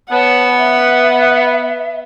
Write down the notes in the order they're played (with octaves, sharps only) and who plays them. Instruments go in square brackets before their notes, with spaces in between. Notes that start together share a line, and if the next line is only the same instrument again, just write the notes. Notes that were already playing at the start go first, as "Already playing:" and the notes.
[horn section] B3 [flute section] C#5 A5 [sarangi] F#5
[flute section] E5